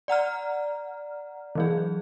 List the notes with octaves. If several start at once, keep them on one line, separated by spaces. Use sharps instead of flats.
D5 F#5 A#5 F6
E3 F#3 G#4